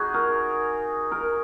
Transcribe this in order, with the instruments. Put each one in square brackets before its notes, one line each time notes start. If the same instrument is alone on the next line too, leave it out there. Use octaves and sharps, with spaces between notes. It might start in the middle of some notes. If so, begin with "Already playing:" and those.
Already playing: [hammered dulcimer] D#4 F#4 G#4
A#4
A#4